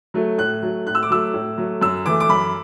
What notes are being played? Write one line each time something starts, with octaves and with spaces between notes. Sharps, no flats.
F#3 A3
A2 F#6
F#3 A3
A2 F#6
E6
D6
F#3 A3 E6
A2
F#3 A3
F#2 E6
E3 A3 D6
D6
F#2 B5